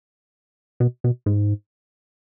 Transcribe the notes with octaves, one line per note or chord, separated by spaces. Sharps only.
B2
B2
G#2